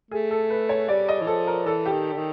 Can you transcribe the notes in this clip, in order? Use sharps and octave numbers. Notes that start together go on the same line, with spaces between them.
A3 G#4
A4
B4
C#5
G3 D5
D#5
E3
F3 A4
A#4
E3 A4
G4
D#3
D3
D#3